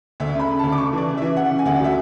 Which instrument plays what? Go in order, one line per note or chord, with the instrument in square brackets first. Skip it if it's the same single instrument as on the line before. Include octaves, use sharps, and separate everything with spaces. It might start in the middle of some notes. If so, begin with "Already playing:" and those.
[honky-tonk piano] D2 E5
C#3
B5
C#3
D2 A5
D6
C#3 C#6
E3 D5
C#3
E3 E5
C#3 F#5
C#3
G#5
D2 F#5
F#3 E5